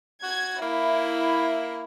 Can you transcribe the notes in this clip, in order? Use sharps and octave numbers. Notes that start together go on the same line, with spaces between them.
F#4 G#6
A#3 E4